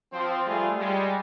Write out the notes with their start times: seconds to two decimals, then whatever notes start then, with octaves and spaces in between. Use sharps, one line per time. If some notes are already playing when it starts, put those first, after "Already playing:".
0.13 F3 C4
0.46 G3 A3 F4 G#4
0.79 G3 G#3